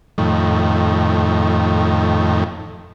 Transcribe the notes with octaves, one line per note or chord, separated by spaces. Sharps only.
F2 A2 D#3